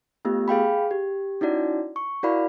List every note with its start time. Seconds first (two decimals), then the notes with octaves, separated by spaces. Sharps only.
0.25 A3 B3 F4 G4
0.48 G#4 F5 G5 B5
0.91 G4
1.41 C#4 D#4 E4 F#4 D5
1.96 C#6
2.23 E4 F#4 A#4 D5 F5 B5